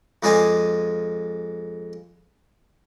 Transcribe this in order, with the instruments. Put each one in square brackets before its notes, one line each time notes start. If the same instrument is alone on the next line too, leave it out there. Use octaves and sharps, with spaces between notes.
[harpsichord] F2 G#3 F4 D5 G#5